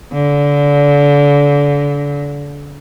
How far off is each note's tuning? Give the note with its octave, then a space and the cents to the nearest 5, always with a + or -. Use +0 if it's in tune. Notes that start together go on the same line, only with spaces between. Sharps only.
D3 -30